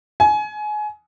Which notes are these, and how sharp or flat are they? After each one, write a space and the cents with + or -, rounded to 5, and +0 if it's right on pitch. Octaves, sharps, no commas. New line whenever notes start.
G#5 +25